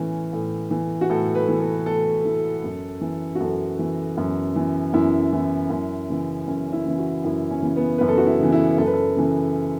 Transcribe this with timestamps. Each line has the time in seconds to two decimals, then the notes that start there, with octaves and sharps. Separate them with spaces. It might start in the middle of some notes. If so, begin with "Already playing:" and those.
Already playing: A2 E3 C#4
0.33 A2
0.71 E3
1.01 F#4
1.10 A2 A4
1.35 B4
1.48 E3
1.60 A4
1.86 A2 A4
2.25 E3
2.64 F#2
3.01 E3
3.35 F#4
3.40 F#2 A4
3.79 E3
4.17 F#2
4.56 E3
4.94 F#2 E4
5.33 E3
5.70 F#2
6.10 C#3 E3
6.47 F#2 C#4
6.73 E4
6.85 C#3 E3
6.98 F#4
7.24 F#2 E4
7.51 C#4
7.62 C#3 E3
7.76 B3
7.98 F#2 B4
8.08 A4
8.17 F#4
8.27 E4
8.39 C#3 E3
8.52 E4
8.78 F#2 A4
8.87 B4
8.94 A4
9.16 C#3 E3